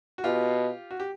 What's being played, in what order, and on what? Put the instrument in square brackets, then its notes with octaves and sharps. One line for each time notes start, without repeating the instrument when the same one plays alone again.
[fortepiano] F#4
[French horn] B2 [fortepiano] F4 G4
[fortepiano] F#4
G4